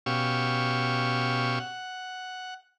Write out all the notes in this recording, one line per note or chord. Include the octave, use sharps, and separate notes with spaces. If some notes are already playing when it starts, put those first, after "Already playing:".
B2 C#4 G4 F5 C#6 E6
F#5